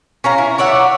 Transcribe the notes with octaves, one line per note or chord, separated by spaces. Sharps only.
C#4 F5 A#5
E4
C#5 D5 E5 F#5